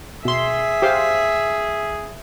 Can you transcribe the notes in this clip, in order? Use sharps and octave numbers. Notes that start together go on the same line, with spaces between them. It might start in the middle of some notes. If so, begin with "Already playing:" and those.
B2 G#4 E5 C6
G4 C5 F5